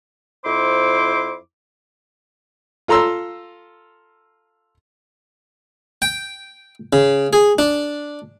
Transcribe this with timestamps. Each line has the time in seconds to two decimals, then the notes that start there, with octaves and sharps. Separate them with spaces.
0.44 F2 E4 C5 C6 D6
2.88 F4 A4 A#5 C6 E6
6.02 G5
6.93 C#3
7.33 G#4
7.59 D4